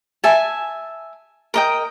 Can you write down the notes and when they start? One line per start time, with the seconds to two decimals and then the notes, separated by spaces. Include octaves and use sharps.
0.24 E5 G#5 A5
1.54 A#4 D#5 G5